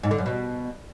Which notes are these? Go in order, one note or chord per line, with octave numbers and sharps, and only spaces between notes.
G#2
D3
F#2
B2